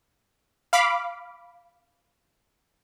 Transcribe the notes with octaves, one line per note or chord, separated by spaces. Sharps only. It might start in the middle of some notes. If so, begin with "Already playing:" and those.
F5 B5 D6